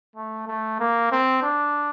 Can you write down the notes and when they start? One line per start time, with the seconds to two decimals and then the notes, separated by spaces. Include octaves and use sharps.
0.16 A3
0.47 A3
0.80 A#3
1.12 C4
1.42 D4